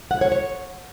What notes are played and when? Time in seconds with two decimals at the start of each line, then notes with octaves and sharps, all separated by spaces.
0.11 F#5
0.21 C#5
0.32 C#5